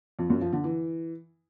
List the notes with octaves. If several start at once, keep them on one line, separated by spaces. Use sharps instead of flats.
F2
F#2
F3
D3
E3